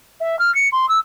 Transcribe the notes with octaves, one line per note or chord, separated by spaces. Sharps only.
E5
F6
C#7
C6
E6